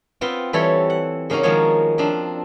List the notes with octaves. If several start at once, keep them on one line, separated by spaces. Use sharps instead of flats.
B3 C4 F4 G5
E3 G3 C4 A4 C#5
F#5
C#3 A#3 C#4 D#4 F#4
D#3 F3 G#3 D#4 F#4 C#5
F3 C4 D4